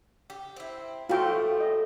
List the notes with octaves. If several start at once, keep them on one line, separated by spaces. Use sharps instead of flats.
G4
C4 E4
A2 A3 F4 F#4 G5
D#5